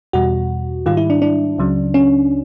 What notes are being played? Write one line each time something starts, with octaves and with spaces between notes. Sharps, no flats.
E2 B2 G3 F#4
G#2 D#3 G3 F4
E4
D4
D4
C#2 C#3 F#3
C#4